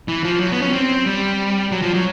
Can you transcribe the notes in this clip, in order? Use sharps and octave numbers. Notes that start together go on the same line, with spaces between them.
E3
F3
F#3
B3
C#4
C4
G3
F#3
F3
F#3